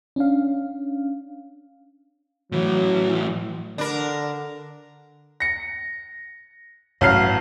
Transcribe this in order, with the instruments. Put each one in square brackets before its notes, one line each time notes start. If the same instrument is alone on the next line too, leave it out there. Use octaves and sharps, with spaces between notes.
[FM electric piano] C#4 D4 F5
[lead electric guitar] A2 E3 [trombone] F#3
[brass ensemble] D3 [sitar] D4 A#4
[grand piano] A#6 C#7
A1 F#3 F5 F6 C7